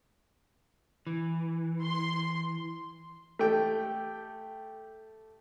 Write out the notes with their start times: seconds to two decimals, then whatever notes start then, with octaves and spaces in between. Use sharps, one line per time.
1.07 E3
1.82 C6
3.39 A3 G4 G5